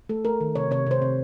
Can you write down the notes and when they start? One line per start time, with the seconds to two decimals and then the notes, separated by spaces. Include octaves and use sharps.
0.09 A3 A4
0.25 A3 A#4
0.41 D#3
0.55 C3 C#5
0.71 C3 C#5
0.87 C3 C5
1.02 C3